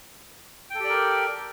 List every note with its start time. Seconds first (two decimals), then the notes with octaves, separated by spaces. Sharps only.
0.70 G5
0.75 A4
0.80 G4
0.84 D5
0.89 A#4